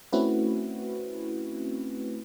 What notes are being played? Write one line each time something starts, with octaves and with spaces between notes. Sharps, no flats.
A3 C4 C#4 E4 F#4 B4